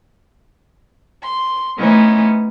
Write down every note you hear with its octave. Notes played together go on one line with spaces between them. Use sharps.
C6
E3 A3 B3 C#4 D#4 C5